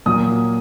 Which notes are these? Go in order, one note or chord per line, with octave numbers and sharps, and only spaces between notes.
A#2 F#3 A#3 D#6